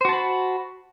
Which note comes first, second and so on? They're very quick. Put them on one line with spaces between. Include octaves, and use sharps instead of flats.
C5 F#4 A5 B5